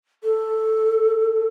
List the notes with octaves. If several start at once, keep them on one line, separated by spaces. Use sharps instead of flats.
A4